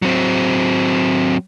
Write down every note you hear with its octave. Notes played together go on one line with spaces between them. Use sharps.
F#3 C4